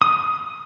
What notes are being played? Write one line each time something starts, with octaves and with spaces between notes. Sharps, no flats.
D#6